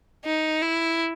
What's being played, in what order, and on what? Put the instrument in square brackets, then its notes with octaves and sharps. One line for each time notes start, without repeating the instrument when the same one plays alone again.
[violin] D#4
E4